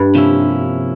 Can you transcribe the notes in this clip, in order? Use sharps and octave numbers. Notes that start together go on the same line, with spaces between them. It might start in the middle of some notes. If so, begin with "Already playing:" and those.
Already playing: G2
C3 F3 A#3 C#4 E4